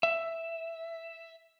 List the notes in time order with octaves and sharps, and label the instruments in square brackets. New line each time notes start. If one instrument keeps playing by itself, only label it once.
[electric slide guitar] E5